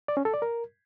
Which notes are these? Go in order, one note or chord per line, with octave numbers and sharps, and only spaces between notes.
D5
C#4
A4
D5
A#4